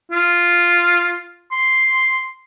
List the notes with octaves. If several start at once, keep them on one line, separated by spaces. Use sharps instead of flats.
F4
C6